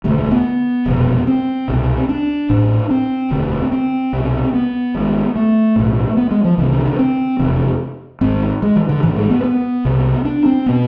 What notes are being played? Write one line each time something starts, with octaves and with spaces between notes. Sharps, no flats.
E1 D2 D3 A3
A3
B3
F1 E2 B2
C4
C2 B2
D4
A1 A2
C4
E1 D2 D3
C4
C2 B2
B3
G#1 G#2
A3
B1 A2
B3
G#3
F3
C2 C3 E3
D3
D3
C4
F1 E2 C3
G#1 G#2 C4
G#3
E3
D3
A1 G#2 E3
G#3
B3
B3
C2 C3
D4
C4
B2 B3